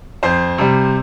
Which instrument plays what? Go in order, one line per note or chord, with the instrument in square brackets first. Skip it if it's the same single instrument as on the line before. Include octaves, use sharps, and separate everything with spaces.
[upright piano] F2 C5
C3 G3